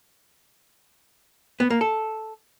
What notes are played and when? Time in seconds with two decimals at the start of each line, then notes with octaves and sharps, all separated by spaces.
1.60 B3
1.70 A#3
1.81 A4